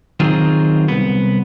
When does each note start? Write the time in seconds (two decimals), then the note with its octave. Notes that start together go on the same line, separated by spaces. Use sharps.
0.20 D#3 F#3 C4 F4 G#4
0.88 C2 B3